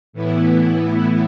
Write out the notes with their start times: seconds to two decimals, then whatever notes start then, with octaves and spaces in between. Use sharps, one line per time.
0.13 A2 E3 B3 E4